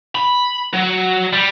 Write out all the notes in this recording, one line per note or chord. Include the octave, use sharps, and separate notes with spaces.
B5
F#3
G3